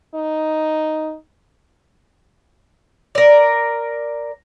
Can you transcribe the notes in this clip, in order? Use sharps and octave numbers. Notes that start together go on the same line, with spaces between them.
D#4
A#4 D5